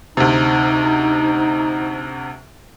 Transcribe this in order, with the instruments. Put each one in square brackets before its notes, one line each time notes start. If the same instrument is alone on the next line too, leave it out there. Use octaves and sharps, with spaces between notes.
[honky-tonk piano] D2 C3 [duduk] D#4